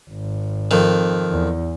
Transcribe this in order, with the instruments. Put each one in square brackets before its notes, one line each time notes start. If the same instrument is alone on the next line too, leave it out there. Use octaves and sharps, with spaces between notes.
[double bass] G#1
[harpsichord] F2 D#3
[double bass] E2